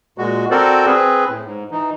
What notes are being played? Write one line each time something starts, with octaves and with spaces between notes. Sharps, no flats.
A#2 G#3 F#4
C4 F#4 A4 A#4 C5 D5
C4 G#4 B4
A2
G#2
E3 D#4